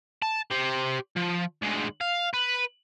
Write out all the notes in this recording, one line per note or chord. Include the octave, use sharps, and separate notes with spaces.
A5
G4 C5
F3
D2 G#3
F5
B4